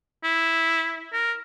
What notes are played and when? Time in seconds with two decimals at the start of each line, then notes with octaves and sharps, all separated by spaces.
0.24 E4
1.13 A#4